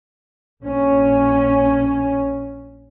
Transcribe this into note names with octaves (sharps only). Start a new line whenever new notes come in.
A#1 C#4